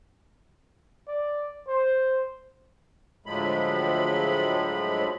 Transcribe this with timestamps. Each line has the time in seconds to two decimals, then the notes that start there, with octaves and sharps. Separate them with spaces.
1.08 D5
1.68 C5
3.26 D2 A2 F3 F#3 G#3 B5